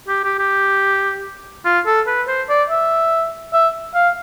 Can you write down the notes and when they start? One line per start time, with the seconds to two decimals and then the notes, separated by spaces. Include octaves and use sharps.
0.08 G4
0.24 G4
0.39 G4
1.65 F4
1.87 A4
2.07 B4
2.28 C5
2.49 D5
2.69 E5
3.54 E5
3.95 F5